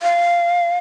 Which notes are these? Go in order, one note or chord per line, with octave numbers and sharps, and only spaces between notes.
F5